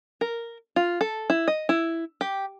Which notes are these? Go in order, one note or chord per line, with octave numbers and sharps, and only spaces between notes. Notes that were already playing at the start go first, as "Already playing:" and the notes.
A#4
F4
A4
E4
D#5
E4
G4